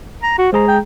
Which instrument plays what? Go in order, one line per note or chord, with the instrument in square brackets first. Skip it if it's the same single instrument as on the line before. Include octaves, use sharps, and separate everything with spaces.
[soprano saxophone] A#5
F#4
[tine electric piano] G#3 G#4 A#5 [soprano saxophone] C5
[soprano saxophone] G5